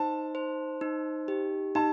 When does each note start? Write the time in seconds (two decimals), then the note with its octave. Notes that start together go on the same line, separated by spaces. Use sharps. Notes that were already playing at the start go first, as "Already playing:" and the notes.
Already playing: D#4 C5 A5
0.35 C5
0.81 D#4
1.28 G4
1.75 D#4 A5